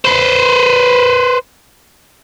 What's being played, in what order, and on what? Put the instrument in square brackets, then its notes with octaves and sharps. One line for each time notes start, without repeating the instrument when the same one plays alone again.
[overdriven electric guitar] B4 C5